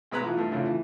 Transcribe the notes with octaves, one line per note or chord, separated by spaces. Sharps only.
B1 G#3 B4 A#5 F#6
E3 F3
G2 A3
F2 A2 C#3 A3 D4
E3